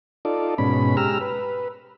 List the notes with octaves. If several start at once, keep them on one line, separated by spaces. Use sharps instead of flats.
D#4 F4 A4 D5
G#2 B2 C#4 B5
G#3 G4 A#5 E6 F6
B4